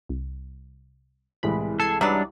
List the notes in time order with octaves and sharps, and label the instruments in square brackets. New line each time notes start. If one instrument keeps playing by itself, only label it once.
[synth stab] C2
[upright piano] C2 E3 G#3 [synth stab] A2 B5
[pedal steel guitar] A4 [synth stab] A5 G#6 C7
[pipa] F#3 D#4 D5 [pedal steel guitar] G3 D4 [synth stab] B4 E5